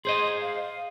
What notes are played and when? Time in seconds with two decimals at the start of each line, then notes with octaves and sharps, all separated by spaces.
0.05 G#4 C5 D#5 C6
0.42 F5